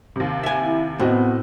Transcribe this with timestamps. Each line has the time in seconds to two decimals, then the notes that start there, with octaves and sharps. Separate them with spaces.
0.16 D#2 C3
0.43 E5 G#5
0.62 E4
1.00 A2 B3 C4 F#4 D#5